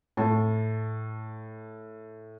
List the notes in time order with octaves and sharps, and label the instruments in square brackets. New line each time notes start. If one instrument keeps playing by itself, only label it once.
[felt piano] A2 A5